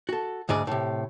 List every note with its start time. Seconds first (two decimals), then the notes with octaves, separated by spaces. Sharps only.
0.09 F#4 A4
0.49 D2 G#2 G#4 D5
0.67 A2 C3